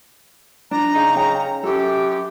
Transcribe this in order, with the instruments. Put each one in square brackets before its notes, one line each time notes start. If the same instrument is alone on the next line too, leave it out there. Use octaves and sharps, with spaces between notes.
[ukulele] D4 [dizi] A#5
[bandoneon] C#3 D#4
[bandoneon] C#3 [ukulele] C#4 G5
[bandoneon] F#2 [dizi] G4 [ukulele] A4